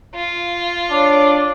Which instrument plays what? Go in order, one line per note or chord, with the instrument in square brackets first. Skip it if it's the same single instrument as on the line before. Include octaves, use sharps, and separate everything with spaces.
[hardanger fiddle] F4
[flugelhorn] D4 [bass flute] C#5 [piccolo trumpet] D6